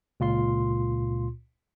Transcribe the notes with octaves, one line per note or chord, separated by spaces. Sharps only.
C#2 A#2 F4 C6